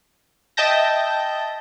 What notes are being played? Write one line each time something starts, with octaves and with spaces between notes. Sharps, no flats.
D#5 E5 G5 A5 G6 A#6